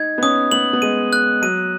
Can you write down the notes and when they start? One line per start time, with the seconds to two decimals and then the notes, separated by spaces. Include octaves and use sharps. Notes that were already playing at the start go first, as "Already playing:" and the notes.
Already playing: D#4 G#6
0.18 B3
0.23 C#4 D#6
0.52 B3 F#7
0.73 B3
0.82 G#3 D#7
1.13 F#6
1.42 F#3 D#7